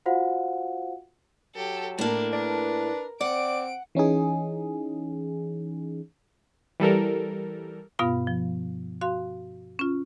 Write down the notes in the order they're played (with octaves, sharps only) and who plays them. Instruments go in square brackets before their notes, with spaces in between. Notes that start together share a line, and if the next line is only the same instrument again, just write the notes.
[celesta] F4 F#4 C5 F5 F#5
[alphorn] F#3 [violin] G4 A4
[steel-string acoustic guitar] A2 A#3 [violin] D4 A#4
[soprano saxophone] D4 [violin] A#4 [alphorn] B4
[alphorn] C4 [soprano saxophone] D5 [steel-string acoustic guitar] F#5 [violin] D7
[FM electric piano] E3 C#4 D#4 G#4
[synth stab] E3 G3 A4 A#4
[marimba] G2 B2 B3 F4 F5 B5
F3
F#4 F5 C6
C#4 F4